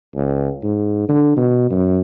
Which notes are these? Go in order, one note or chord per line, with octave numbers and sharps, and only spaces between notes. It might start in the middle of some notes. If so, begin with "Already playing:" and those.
C#2
G#2
D3
B2
F#2